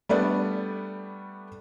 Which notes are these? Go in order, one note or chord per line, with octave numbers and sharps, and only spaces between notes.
G3 A3 B3 D4